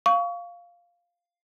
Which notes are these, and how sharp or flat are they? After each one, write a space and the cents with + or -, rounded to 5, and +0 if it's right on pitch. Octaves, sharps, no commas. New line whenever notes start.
F5 +0 C#6 +25